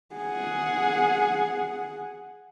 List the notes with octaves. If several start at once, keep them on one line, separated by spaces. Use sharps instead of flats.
G#4 F#5